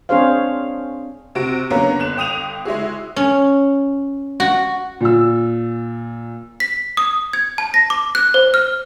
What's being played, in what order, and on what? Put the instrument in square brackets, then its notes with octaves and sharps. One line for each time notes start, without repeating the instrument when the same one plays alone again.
[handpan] C4 D4 G#4 C5 C#5 F5
[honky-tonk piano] C3 F#4 D7
D3 F#3 A#3 B3 C#4
G1 F#6 E7
G1 G5 D#6 D#7 F7
G#3 E4 F#4 G#4
[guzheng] C#4
F#4
[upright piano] A#2 E6
[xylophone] B6
D#6
G#6
A5
A#6
D6
F#6
C5
F6